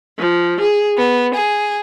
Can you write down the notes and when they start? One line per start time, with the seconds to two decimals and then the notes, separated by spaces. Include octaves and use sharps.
0.18 F3
0.60 G#4
0.96 B3
1.33 G#4